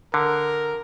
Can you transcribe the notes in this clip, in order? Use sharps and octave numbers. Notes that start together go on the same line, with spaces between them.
D3 A#4